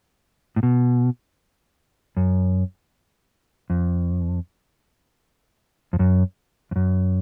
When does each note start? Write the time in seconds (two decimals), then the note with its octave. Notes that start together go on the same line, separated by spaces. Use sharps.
0.56 A2
0.63 B2
2.17 F#2
3.70 F2
5.93 F2
5.99 F#2
6.71 F2
6.76 F#2